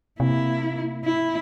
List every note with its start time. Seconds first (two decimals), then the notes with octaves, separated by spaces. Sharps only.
0.20 C3 A#3 E4
1.04 E4